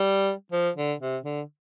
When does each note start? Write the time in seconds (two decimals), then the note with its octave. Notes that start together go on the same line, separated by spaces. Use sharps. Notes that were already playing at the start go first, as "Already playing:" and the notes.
Already playing: G3
0.52 F3
0.76 D3
1.01 C3
1.24 D3